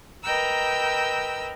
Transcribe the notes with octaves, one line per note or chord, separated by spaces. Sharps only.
A#4 B4 D#5 G5 A#5 E6